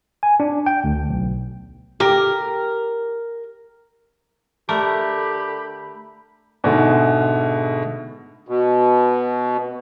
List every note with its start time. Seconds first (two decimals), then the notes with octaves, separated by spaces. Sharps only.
0.23 G#5
0.40 D4
0.66 G5
0.84 D2
1.09 B1
2.00 G4 A#4
4.69 D3 A3 G4 A#4 B5
6.64 G#2 B2 D3 G#3 A3
8.48 B2